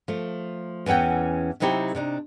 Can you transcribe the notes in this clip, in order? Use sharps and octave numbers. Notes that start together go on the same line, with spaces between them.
F3 A3
E2 E3 C#4 F#5 G5
C3 F#3 C4 D#4 E4 G4
C3 D4 D#4